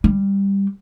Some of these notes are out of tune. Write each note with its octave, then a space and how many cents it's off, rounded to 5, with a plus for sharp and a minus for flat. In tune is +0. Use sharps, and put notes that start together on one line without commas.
G3 +10